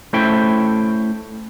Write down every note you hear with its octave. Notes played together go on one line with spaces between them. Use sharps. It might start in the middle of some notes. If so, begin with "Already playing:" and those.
A3 C#4 E4 C5 E5 G5